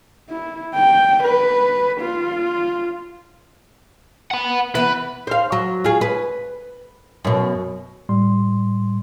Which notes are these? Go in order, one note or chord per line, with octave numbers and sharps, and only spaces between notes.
E4
G5
B4
F4
F#5 B5
E3 B3 B4
C5 F5
F#3
F4 G#4
B4
F#2 B2
A2 G3 C6